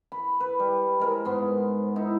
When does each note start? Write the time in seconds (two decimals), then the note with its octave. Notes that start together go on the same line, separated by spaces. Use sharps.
0.12 B5
0.40 B4
0.59 G3
1.00 G#3 A#4 C5
1.25 G#2 B3 C6
1.96 D#4 E4